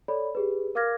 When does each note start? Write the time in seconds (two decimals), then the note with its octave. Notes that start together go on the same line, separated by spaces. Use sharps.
0.08 A4 C#5 D5 B5
0.35 G4 G#4 B4
0.75 A#4 F5 D6 F6 G#6 A#6